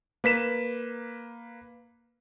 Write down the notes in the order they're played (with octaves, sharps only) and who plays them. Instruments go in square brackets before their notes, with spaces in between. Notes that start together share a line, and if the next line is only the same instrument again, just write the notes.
[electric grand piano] A#3 B4 B6 E7